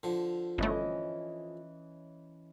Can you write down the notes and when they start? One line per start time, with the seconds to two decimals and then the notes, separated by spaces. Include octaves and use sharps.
0.03 D3 F3
0.58 G1 E3 A3 C#4 D#5